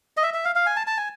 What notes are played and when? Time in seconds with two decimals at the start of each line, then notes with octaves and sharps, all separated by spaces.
0.17 D#5
0.23 E5
0.34 E5
0.45 F5
0.55 F5
0.66 G#5
0.76 A5
0.87 A5
0.97 G#5